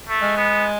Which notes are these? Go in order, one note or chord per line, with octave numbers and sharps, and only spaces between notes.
A3
G#3
B3